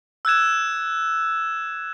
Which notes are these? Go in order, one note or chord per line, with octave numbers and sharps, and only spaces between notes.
E6 F#6 G#6 E7